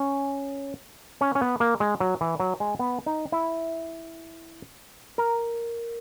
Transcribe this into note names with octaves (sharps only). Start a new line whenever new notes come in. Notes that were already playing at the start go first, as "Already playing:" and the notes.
Already playing: C#4
C#4
C#4
B3
A#3
G#3
F#3
E3
F#3
G#3
B3
D#4
E4
A#4